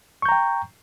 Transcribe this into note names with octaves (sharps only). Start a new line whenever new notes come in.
G5 A#5 C#6 G6